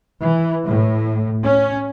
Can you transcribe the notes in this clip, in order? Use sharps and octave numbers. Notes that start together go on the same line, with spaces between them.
E3
A2
C#4